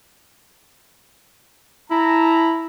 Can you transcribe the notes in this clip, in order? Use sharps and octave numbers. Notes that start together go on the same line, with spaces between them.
E4 A5 A#5